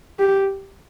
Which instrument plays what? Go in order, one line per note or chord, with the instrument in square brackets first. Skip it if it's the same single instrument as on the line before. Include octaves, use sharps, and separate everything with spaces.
[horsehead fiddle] G4